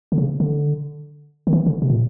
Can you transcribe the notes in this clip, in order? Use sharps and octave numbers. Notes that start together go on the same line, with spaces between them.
D3
C#3
D3
D#3
E3
D3
C3
A#2